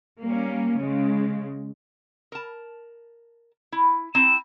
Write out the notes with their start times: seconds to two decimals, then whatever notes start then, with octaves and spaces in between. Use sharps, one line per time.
0.22 G3 A#3 C#4
0.80 C#3 G#3
2.32 A#4 A5
3.72 E4
4.15 C4 E4 A#5 E7